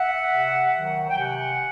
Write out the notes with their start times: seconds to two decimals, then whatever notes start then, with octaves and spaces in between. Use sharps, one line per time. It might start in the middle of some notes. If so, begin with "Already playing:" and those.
Already playing: E5 F#5
0.31 C3
0.75 D#3 F#3
1.10 G5
1.18 C3 F#5 G#5